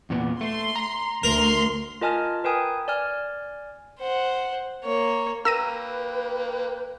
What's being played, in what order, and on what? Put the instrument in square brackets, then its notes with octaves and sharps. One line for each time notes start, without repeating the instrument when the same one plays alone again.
[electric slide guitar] E2 A#2 B3
[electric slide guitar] A3 [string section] C6
[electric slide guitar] A#5
[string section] D2 C6 [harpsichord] A#4
[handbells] F4 A#4 D#5 G#5 A5 F6
A#4 B4 G5 G#5 D#6
D5 G#5 F6
[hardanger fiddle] C5 F#5
A#3 C#5
[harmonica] A#3 G5 [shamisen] A#4 [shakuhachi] B4 [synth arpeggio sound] E6 A#6 D#7